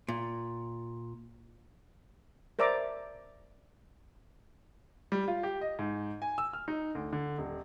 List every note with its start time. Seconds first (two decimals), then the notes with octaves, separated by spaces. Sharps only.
0.09 A#2
2.59 A#4 C5 D5 E5 A#5 D6
5.12 G3
5.28 F4
5.43 G4
5.61 D#5
5.79 G#2
6.22 G#5
6.38 E6
6.53 F6
6.68 D#4
6.95 D2
7.13 D3
7.38 D#1